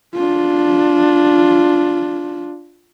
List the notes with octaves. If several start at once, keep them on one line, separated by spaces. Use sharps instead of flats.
D4 F4